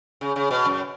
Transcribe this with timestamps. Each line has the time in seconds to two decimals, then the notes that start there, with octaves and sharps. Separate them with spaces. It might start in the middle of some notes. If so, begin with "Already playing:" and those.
0.21 C#3
0.36 C#3
0.50 B2
0.65 F#2